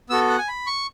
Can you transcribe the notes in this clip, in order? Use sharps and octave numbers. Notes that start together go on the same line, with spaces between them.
B3 F#4 A4 E6
F#5
G#5
B5
C#6